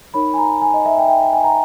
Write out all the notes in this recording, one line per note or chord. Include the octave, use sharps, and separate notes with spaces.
D#4 A#4 C#5 B5
G#5
A#5
G#5
D#5
E5
G5
E5
G5
G5
G#5
A#5